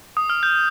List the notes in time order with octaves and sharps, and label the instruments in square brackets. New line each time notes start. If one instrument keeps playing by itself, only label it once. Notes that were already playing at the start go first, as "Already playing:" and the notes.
[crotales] D#6
F6
G6